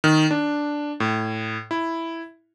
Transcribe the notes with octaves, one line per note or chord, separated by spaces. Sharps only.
D#3
D4
A2
E4